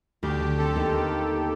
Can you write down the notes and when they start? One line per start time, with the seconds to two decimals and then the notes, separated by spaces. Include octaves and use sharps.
0.23 D2 G4
0.40 D3
0.58 C4 A4
0.76 D#2
0.93 A#3